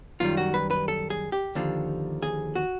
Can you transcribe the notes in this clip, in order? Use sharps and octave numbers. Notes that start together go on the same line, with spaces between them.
F#2 D#3 G3 F4
F#4
B4
B4
A4
G#4
G4
D#2 D3 F3
G#4
F#4